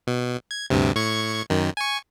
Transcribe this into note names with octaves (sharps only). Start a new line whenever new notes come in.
B2
G#6
D2 G2 C3
A2 C#6 G#6
F#2 D#3
G#5 C#6